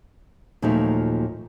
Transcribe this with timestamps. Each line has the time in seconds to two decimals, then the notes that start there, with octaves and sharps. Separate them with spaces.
0.62 D#2 A#2 F3 F#3 A3 D#4